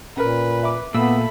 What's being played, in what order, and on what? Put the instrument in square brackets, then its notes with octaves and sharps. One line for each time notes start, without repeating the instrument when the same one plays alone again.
[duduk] A#2 [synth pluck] C#4 A#4 [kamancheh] B4
[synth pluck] E5 B5 D6
[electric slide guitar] A#2 [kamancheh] A3 B5 [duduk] B3 [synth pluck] E6